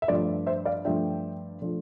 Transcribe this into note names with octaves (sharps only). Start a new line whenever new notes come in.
E5
G2 F3 A3 D4 D5
C5 E5
D5 F5
G2 F3 A3 D4 E5 G5
F3 A3 D4